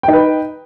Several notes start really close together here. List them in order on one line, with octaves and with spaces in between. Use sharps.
G5 D#4 B4